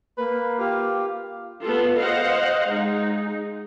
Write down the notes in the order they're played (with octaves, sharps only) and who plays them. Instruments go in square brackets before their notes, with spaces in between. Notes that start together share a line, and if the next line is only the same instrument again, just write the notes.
[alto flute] A#3 [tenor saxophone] B4
[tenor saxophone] F4 [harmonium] G4 F5
[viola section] B3 F4 A4
C5 D#5 F5 F#5
G#3 D#4